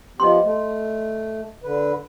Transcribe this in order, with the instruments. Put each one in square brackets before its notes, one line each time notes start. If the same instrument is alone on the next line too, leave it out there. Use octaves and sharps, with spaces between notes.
[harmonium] F3 B3 G4 [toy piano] D#5 C6
[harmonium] A3
D3 B4